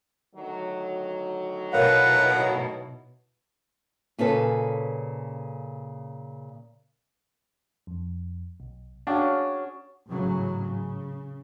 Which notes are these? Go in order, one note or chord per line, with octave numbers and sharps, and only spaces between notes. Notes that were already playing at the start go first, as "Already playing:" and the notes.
D2 D#3 F#3
B2 E4 A#4 B4 C#5 F5 F#5 A#5
A#2 C#3 C#4 A4 B4
F2
B1
C#4 D4 F#4 G#4 F5 G5 A5
A1 G#2 C#3 E3 F#3
C#3